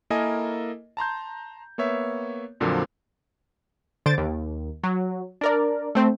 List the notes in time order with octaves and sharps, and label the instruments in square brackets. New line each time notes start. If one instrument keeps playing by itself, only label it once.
[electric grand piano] A#3 E4 A4 A#4 D#5 G#5
A5 A#5 C6 G6
A#3 B3 C#5 E5
F2 A#2 D3 F3 F#3 A#3
[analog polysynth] D3 C5 A6 D7
D#2
F#3
D4 A#4 D5
A3 C4